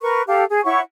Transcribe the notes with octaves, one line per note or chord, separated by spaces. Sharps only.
A#4 B4 C#6
G4 A4 F5
G#4
E4 C#5 F#5 C#6